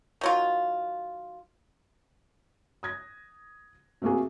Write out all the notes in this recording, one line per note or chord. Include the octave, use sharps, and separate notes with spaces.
D#3 F#3 F4
D#6 G#6 A#6
C3 A3 A#3 F#4 G#4